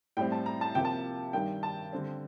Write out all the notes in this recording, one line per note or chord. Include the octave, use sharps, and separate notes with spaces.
A2 G3 C4 G5
A5
A#5
A5
C3 F3 A#3 G5
A5
G2 D#3 G3 G5
A5
D3 G3 C4